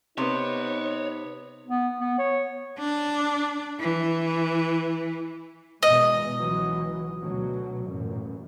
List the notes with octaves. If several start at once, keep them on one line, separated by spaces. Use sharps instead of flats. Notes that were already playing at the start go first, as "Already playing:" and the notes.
C3 B3 D#4 C#5
B3
B3
C#5
D4
E3
E2 B2 G#3 D#5
C#2 E3 F#3
D2 B2 F#3
A1 F#2 A#2